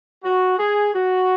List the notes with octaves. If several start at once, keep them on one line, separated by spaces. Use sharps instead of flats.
F#4
G#4
F#4